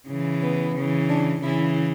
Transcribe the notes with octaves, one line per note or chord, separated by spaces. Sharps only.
C#3 E3
B3
C#3 E3
D4
C#3 E3 E4